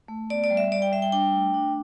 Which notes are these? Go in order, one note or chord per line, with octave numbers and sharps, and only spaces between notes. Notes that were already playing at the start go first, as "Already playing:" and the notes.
A3
B3 D5
D5
G3
E5
G3 D5
G5
G3 E5
G5
D4 G5
A3
D4